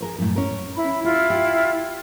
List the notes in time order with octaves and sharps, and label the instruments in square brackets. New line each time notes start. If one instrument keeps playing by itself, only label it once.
[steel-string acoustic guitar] G#4 A#4 C5
F#2 A2
C#4 A#4
[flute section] E4 B5
[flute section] E4 F4 [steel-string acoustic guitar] G4
[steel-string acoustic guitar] G4